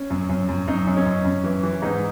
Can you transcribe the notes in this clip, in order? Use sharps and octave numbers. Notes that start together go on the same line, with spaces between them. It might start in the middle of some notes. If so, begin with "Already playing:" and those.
Already playing: C#4
F#2
F#2
F#2
F#2 D#4
F#2
C#4
F#2
F#2
E3
E3
G#2 D#4